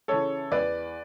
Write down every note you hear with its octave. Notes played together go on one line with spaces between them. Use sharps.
C#3 E3 A4 C#5
E2 B4 D5